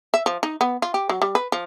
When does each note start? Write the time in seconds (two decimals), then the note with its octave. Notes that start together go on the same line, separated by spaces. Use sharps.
0.14 E5
0.26 F3
0.43 D#4
0.61 B3
0.82 F4
0.94 G4
1.09 F#3
1.22 G3
1.35 B4
1.52 F3